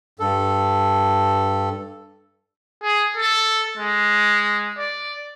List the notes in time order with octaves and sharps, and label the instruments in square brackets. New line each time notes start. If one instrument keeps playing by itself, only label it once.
[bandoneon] G2 A4
[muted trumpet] G#4
A4
G#3
D5